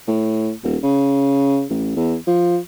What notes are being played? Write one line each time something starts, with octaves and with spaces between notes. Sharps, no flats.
A2
D#1
C#3
A1
E2
F3